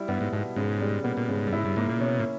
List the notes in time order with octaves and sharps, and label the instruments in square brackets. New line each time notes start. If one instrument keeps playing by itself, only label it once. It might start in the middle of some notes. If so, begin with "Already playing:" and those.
Already playing: [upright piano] G3 E4
[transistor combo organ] G2 [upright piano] B3
[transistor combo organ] G#2
[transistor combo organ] G#2 [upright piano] B2
[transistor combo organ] G#2 [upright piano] C#3
[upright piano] G3
[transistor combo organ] A#2 [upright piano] B3
[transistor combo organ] A#2
[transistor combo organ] G#2 [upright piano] C#3
[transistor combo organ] G2
[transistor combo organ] G#2 [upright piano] E4
[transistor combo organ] G2
[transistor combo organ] G#2 [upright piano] A#3
[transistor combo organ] A#2
[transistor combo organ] B2 [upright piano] C#4
[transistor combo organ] A#2